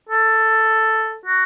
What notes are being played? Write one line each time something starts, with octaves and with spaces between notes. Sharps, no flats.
A4
F#4